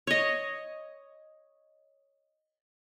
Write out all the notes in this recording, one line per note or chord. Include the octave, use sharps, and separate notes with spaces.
C#5 D#5